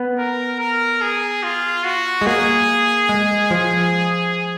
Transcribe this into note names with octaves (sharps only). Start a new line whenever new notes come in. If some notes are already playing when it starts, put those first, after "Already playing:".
Already playing: B3
A#4
A#4
G#4
F4
F#4
G#3
A#3 G#4
G#3
F3